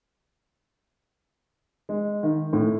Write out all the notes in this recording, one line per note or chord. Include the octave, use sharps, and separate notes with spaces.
G#3
D#3
A2